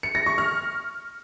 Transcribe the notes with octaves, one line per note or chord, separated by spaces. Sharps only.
C#7
A#6
C#6
F6